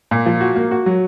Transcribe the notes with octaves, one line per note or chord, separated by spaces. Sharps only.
A#2
F3
F#4
A#3
F#4
F#3